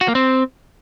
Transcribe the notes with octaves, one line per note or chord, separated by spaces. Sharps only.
F#4
A#3
C4